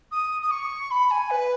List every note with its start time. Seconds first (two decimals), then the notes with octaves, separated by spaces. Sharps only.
0.11 D#6
0.42 D#6
0.51 C#6
0.91 B5
1.11 G#5
1.30 B4